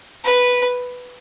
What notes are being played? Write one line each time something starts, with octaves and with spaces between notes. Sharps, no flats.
B4